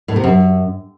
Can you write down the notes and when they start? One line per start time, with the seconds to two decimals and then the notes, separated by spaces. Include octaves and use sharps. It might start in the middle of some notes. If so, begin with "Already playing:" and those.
0.08 A2
0.16 C3
0.24 F#2